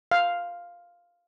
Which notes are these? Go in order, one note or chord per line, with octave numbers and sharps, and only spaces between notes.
F5